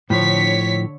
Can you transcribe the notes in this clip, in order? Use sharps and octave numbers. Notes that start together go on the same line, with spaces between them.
A2 D3 F3 C#5 B6